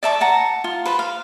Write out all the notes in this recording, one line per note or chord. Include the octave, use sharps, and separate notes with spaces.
D5 E5 A5 C#6
F#5 A5 A#5
F4
B4 C5 B5
F5